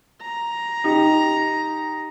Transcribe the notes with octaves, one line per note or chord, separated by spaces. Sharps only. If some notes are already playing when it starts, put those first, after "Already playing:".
A#5
D#4 G4